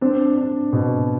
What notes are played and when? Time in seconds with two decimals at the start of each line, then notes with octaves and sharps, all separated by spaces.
0.01 C4 D4
0.37 D4
0.73 B2